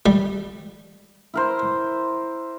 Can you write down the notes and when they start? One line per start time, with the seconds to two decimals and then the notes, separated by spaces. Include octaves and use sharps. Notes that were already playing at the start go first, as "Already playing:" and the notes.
0.06 G3
1.34 E4 A#4 C5